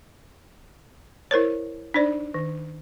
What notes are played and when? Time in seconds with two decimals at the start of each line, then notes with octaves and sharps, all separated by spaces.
1.31 E4 A#4 C5 C#5
1.94 D4 D#4 C5 D5
2.34 D#3